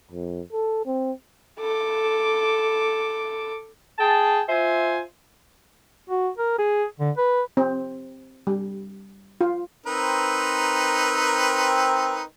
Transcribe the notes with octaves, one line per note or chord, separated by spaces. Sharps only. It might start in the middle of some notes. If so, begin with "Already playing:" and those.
F2
A4
C4
A4 D6
G#4 G5 A5
F4 C5 E5 G#5
F#4
A#4
G#4
D3
B4
C4
G3
F4
C4 D#4 A#4 B4